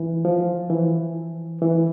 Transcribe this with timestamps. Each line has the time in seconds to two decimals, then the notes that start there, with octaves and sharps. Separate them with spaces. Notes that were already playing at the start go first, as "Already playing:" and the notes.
Already playing: E3
0.25 F3
0.70 E3
1.62 E3